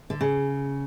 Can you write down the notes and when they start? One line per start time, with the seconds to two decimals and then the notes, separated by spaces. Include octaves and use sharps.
0.10 D3
0.21 C#3